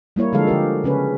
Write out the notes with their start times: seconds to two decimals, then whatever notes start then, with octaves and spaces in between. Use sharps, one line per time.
0.16 G3 A#3 E4 C#5
0.33 D3 F3 G#3 A4 F5
0.47 D3 F3 G4 A#4
0.84 C#3 C#4 B4